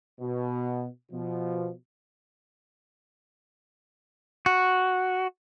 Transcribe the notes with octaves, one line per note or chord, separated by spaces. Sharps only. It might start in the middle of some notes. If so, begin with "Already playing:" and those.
B2
B2 F3
F#4